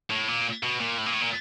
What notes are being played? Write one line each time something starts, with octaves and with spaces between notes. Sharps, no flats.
A2
A#2
B2
A#2
A2
A#2
A2
A#2